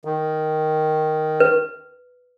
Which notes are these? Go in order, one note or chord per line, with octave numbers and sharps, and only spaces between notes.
D#3
B4